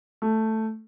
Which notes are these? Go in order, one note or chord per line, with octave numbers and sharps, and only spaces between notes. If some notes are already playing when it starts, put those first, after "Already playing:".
A3